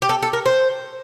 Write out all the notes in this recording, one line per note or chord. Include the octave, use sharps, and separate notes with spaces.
G4
A4
A4
A#4
C5